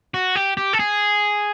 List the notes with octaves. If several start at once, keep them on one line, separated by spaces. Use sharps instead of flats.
F#4
G4
G4
A4
G#4